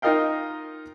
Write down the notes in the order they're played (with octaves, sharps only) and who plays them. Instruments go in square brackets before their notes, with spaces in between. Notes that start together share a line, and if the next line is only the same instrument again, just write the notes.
[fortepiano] D#4 F4 A#4 D#5 F5 G5